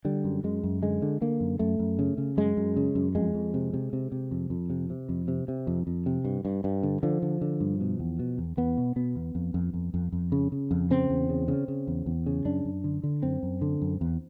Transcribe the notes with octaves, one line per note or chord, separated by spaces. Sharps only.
D3 G3
F#2
F#2 G#3
F#2
D3 G#3
D3
D3 A#3
F#2
F#2 A3
F#2
C#3
C#3
F#2 G#3
F#2
C#3
F#2
F2 G#3
F2
C3
C3
C3
C3
F2
F2
C3
C3
F2
C3
C3
F2
F2
C3
G2
G2
G2
D3
D3 F3
D3
D3
G2
B2
E2
B2
E2
E2 B3
B2
B2 B3
E2
F2
F2
F2
F2
F2
C#3
C#3
F2
C#3 C4
E2
C#3
C#3
C#3
E2
E2
C#3
F#2 D4
F#2
D3
D3
F#2 C4
F#2
D3
F#2
E2